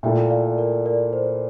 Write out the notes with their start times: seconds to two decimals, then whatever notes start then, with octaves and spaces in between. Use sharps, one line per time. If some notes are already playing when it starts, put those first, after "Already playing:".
0.03 A#2 A3 E4 A4 E5 G5
0.30 D5 F5
0.58 A#4 D5
0.86 A#4 D5
1.13 C5